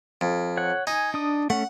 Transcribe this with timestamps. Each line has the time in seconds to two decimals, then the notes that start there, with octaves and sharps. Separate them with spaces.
0.21 F2
0.57 C#5 F#5
0.87 D#4 G#5
1.14 D4 D#6
1.50 A3 C#4 F#5